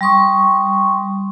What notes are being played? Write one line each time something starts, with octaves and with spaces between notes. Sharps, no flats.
G3 C6 C#6 D#6